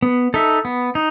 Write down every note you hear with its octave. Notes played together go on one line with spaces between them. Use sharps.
B3
D#4 A4 E5
B3
D#4